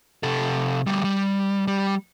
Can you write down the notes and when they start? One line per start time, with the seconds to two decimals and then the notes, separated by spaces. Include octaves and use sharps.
0.23 C3 A4
0.87 D2 G3
1.04 G3
1.67 G3